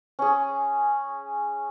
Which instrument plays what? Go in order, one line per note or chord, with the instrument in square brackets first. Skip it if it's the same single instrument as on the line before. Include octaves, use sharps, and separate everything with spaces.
[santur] C#4 G#4